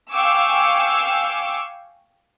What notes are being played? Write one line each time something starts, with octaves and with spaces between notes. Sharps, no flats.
F5 G5 G#5 C#6 D6 E6